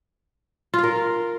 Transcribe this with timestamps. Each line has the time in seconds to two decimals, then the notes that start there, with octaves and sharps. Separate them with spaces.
0.74 F4
0.78 F5
0.83 A#4